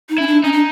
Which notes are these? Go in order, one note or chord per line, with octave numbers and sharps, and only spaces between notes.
D#4
C#4 E4
D4
C#4 D#4
D4